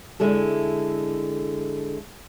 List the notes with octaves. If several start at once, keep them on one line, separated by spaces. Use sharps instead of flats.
D3 G#3 E4 A4